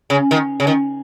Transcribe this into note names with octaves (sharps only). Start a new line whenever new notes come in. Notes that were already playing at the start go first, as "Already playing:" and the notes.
C#3
D#3
C#3
D#3